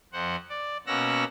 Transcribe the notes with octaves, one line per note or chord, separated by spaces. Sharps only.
F2 C5 F#5
D5
B2 A#3 C#4 F#5 E6 A#6